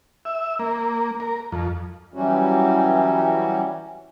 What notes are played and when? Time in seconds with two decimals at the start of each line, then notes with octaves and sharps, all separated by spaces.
0.25 E5
0.59 A#3
1.20 A#4
1.52 F2
2.14 E3 F#3 G3 C#4 F#4